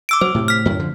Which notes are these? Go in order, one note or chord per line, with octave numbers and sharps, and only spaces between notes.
D6 E6 D7
F#3 C5
A2 C3
F6 B6
F#2 A2 D#3
D3 F3